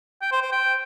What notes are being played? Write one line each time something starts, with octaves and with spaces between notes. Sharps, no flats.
G5
C5
C5
G5